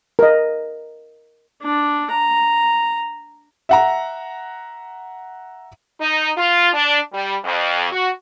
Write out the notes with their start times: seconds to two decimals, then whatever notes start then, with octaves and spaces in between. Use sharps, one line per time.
0.19 A#4 D#5
1.62 D4
2.10 A#5
3.69 E5 F#5 A#5
6.00 D#4
6.37 F4
6.73 D4
7.13 G3
7.44 F2
7.91 F#4